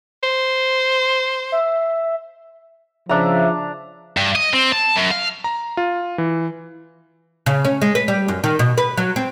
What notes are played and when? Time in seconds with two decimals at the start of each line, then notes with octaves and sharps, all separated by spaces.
0.23 C5
1.52 E5
3.09 C#3 F3 D4 E5 A#5
4.17 G2
4.36 D#5
4.53 C4
4.72 A5
4.96 F#2
5.11 F5
5.44 A#5
5.77 F4
6.18 E3
7.46 C#3
7.65 C#4
7.82 G#3
7.95 B4
8.08 G3
8.28 F#2
8.44 D#3
8.59 B2
8.78 B4
8.97 F#3
9.16 C4